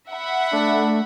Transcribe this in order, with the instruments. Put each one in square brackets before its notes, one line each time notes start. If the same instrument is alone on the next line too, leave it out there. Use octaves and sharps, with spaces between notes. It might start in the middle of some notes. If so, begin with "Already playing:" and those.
[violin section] E5 F#5 B5
[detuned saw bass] A3 [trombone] D4